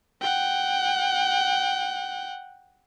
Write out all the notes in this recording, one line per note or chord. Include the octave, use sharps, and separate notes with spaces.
F#5 G5